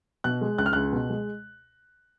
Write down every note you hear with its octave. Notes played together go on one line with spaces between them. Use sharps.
B2 F#6
G#3
C#2 F#6
F6
C#2 F#6
B2
G#3